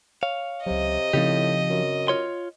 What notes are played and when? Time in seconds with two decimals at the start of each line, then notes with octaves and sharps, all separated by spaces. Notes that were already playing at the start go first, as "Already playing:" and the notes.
0.23 C#5 F5
0.66 C#2 C3 F#3 D#5
1.13 A2 C#3 F3 C4 D#4 G4
1.70 F#2
2.08 F4 C#5 C6